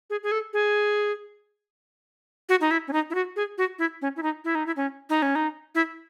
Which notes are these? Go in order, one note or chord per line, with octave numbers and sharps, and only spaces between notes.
G#4
G#4
A4
G#4
F#4
D#4
E4
C#4
D#4
E4
F#4
G#4
F#4
E4
C#4
E4
D#4
E4
D#4
E4
C#4
D#4
C#4
D#4
E4